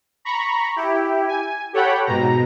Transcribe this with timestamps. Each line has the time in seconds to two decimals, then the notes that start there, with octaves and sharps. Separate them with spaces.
0.25 A#5 B5 C#6
0.76 E4 G4
1.28 G#5
1.73 G4 A4 C#5 F#5 G5 B5
2.06 G#2 B2 A#5